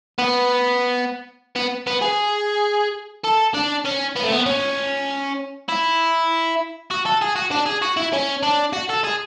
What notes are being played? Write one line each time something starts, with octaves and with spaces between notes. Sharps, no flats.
B3
B3
B3
G#4
A4
D4
C#4
B3
A3
B3
C#4
E4
F#4
A4
G#4
F#4
D4
G#4
F#4
E4
C#4
D4
F#4
A4
G#4